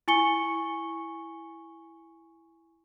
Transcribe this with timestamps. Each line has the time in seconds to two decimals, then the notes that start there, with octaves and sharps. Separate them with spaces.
0.08 E4 G#5 C#6 C#7 G7